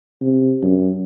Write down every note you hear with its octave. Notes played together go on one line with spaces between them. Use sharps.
C3
F#2